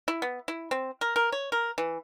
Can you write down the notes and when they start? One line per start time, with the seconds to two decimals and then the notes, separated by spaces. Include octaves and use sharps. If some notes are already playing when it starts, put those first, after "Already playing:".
0.08 E4
0.22 B3
0.48 E4
0.71 C4
1.01 A#4
1.16 A#4
1.32 C#5
1.52 A#4
1.78 E3